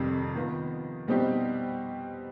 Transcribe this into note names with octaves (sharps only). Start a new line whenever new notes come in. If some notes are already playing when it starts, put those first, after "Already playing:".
Already playing: F2 C3 D#3 G3
D#3 B3 F4
B2 G3 C4 D#4 G4